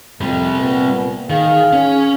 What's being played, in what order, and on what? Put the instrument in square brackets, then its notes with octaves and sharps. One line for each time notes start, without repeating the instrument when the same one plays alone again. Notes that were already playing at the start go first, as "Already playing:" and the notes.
[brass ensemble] F2 [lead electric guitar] C3 G3
[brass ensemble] A#2 B3
[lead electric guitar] D#3 [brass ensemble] G#4 F5
[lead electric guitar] C#4